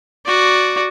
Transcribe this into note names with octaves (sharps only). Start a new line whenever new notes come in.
F#4 D5